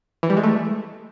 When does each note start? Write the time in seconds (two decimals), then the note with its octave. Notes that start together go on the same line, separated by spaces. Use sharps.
0.23 E3
0.30 G3
0.37 G#3
0.43 A3